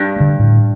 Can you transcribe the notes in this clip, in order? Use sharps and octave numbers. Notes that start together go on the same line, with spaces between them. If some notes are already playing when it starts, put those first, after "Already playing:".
Already playing: G2
D3 A3
A2